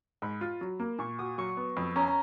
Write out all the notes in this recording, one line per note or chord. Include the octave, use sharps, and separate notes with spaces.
G#2 B5
F4
F#3
A#3
A#2 C#6
F#4 D#6
F#3 C#6
B3
F2 B5
C#4 A#5
A#5